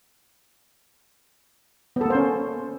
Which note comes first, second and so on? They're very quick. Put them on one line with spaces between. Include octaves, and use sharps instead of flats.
B3 A4 A#3 C5 C#4